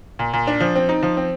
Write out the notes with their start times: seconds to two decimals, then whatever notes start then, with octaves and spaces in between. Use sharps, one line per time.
0.19 A#2
0.33 A#2
0.47 D4
0.60 F3
0.76 C4
0.89 D#4
1.03 F3
1.17 C4